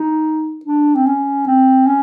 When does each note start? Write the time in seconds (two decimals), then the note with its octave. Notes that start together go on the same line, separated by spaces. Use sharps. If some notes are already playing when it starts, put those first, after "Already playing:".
Already playing: D#4
0.65 D4
0.95 C4
1.07 C#4
1.47 C4
1.87 C#4